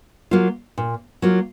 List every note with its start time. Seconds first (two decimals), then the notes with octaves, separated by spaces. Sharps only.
0.31 F#3 A#3 F4
0.78 A#2
1.22 F#3 A#3 F4